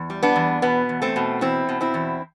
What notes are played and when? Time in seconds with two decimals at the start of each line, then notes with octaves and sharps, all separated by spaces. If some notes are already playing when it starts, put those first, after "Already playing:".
Already playing: E2
0.10 G3
0.23 B3 D4
0.36 E2
0.62 B2 B3
0.89 E2
1.02 A3 C4
1.16 B2
1.41 E2 C4 E4
1.69 B2
1.81 C4 E4
1.94 E2